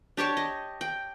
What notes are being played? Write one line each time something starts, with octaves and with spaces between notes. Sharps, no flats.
D4 G4 C#5 A5
D#5
G5